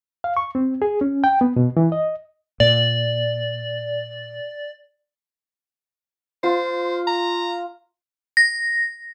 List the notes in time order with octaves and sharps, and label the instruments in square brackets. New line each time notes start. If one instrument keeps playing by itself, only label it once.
[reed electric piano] F5
C#6
C4
G#4
C#4
G5
B3
B2
E3
D#5
[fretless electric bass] A#2 [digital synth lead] D5
[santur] F4 [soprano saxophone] C5
[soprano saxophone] A#5
[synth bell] A#6